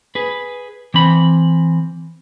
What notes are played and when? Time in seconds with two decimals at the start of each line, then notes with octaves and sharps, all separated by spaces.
0.15 G#4 B4
0.94 E3 C4 B5